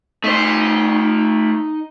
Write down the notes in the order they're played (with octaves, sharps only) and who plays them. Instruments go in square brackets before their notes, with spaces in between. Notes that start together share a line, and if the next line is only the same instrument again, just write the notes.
[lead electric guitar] A3 C5 [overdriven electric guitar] D#4